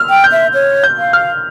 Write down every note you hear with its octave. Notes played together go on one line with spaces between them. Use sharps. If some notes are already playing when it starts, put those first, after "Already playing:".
Already playing: E6 F6
G5
G6
E5
C#5
G6
F5
F6